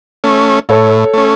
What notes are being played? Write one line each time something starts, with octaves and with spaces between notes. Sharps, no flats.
A3 C#4
A2 A4 C#5
A3 C#4